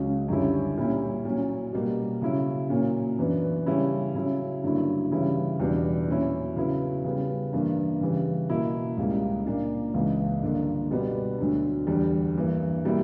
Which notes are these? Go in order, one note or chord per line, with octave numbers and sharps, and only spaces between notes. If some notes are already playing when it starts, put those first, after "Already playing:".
Already playing: C#2 C#3 F#3 C#4
F#2 D3 G3 C#4 E4
A#2 G3 C#4 E4
A#2 F#3 C#4
B2 G3 A#3
C#3 F#3 C#4 E4
A#2 F#3 A#3 C#4
F#2 E3 B3 D4
C#3 G3 C#4 E4
C#3 F#3 C#4 E4
G2 D3 F#3 A#3 E4
C#3 E3 G3 C#4 E4
E2 B2 G3 B3 D4
A#2 F#3 C#4 E4
C#3 F#3 B3 E4
C#3 G3 B3
G2 E3 A#3
C#3 E3 G3
B2 A#3 E4
C#2 C#3 G3 A#3
A#2 A#3 D4
C#2 C#3 E3
G2 D3 A#3
B2 G3 B3 D4
D2 D3 F#3
E2 D3 G3
G2 E3 A#3
B2 G3 A#3 E4